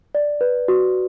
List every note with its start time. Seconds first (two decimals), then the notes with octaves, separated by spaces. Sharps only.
0.15 D5
0.41 B4
0.68 F#4